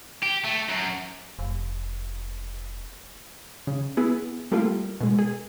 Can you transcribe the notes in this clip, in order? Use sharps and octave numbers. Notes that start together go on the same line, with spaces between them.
G4
A3
F#2
F1
C#3
B3 E4 G#4
G3 A3 A#3 E4 F4
B2 G#3
G#4